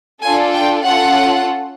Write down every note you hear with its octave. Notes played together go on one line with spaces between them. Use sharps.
D4 F4 A4 G#5
G5
C#4 F4 A4 F#5